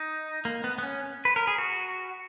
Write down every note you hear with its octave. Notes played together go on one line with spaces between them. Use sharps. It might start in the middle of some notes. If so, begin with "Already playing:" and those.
Already playing: D#4
A#3
B3
B3
C#4
B4
A#4
G#4
F#4